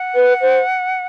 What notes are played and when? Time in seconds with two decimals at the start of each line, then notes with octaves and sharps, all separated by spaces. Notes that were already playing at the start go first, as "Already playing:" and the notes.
Already playing: F#5
0.15 B4
0.41 C5